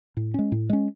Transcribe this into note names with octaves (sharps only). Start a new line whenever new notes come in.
A2
G#3 C#4
A2
G#3 C#4